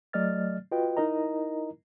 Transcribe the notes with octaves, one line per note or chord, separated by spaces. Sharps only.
F#3 A3 D5 D#5 F6 A6
F4 F#4 B4 D#5 G5
D#4 E4 A#4 D#5 A#5